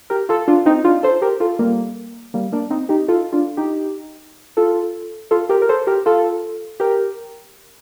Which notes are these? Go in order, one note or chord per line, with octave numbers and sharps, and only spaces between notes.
G4 A#4
F4 A4
D4 F4
C4 D#4
D4 F4
A4 C5
G4 A#4
F4 A4
G3 A#3
G3 A#3
A#3 D4
C4 D#4
D#4 G4
F4 A4
D4 F4
D#4 G4
F4 A4
F4 A4
G4 A#4
A#4
A4 C5
G4 A#4
F4 A4
G4 A#4